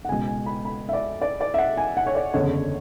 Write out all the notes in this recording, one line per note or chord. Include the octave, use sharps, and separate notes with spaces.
F#5
C#2 B2 G#3 G#5
G#5
B5
B5
E5
D5
D5
D5
E5
F#5
G#5
F#5
C#5
D5
F#1 E2 D3 C#5